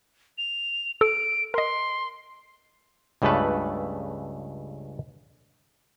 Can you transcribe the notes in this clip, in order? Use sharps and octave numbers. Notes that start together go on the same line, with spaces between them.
F7
A4 D7
A#4 D#5 C6
C#2 G2 C#3 A3 A4 B4